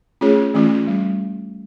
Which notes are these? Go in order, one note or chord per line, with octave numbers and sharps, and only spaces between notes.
A3 C#4 F4 G#4 C#5
E3 A3 C#4 F4
G3